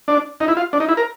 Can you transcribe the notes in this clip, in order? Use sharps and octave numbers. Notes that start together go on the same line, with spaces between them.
D4
D#4
E4
F4
D4
D#4
E4
A#4